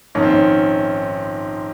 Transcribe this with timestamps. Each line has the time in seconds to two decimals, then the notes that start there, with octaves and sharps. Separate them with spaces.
0.15 A#1 G#2 D#3 C#4
0.23 C4
0.31 C#4